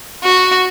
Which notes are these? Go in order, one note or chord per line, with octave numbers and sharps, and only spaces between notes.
F#4